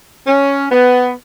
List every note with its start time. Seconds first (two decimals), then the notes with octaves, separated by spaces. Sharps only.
0.26 C#4
0.70 B3